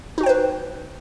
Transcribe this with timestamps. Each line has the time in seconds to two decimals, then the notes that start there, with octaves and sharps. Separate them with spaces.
0.18 D#4
0.21 F#4
0.23 G5
0.26 C5
0.29 B4